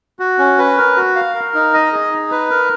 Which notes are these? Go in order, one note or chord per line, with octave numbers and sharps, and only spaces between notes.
F#4
C#4
B4
A#4
F#4
F5
A#4
D#4
D#5
G#4
D#4
B4
A#4